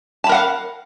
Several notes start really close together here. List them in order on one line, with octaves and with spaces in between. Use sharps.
A5 B5 A#4 F#5 F5